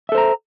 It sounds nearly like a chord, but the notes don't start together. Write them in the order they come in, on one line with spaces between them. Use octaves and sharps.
E5 A4 C5 A#5